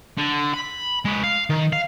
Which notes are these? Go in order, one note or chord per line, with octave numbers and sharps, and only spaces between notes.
D3
B5
G#3 B4
F5
D#3
F5